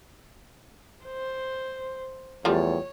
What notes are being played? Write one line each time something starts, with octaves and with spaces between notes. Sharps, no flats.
C5
E2 F3 G3 A3 C#5